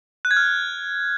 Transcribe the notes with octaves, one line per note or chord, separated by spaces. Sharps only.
F#6
G#6
F6